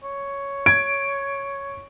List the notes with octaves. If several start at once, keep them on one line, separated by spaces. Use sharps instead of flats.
C#5
G#6 D7